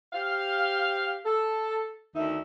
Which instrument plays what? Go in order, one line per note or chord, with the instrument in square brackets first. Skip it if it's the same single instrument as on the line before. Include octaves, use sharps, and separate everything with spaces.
[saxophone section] G4 C5 F5
A4
D2 D#3 D#4 E5